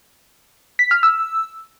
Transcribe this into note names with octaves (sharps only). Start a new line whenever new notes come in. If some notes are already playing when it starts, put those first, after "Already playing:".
B6
F6
E6